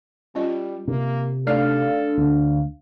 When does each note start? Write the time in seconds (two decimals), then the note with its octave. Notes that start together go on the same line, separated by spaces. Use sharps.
0.35 G3 C#4 F4 D#5
0.88 C3 A#3
1.47 A3 D4 D#4 A4 F5
2.18 D2